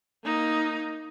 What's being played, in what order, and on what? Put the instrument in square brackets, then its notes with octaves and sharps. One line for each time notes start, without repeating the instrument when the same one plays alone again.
[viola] A#3 D#4